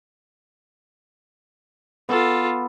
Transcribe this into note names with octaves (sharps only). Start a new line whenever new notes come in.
B3 F4 A4